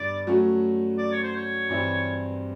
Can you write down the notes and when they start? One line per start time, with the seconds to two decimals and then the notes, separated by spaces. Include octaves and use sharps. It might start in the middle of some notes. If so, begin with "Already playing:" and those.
Already playing: G2 D3 B3 D5
0.27 F#3 A3 C#4 F#4
0.98 D5
1.12 C#5
1.23 C5
1.35 C#5
1.69 G2 E3 G3 C4 E4